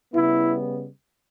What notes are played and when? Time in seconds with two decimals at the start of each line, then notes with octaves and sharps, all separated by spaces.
0.14 C#3 G3 B3 E4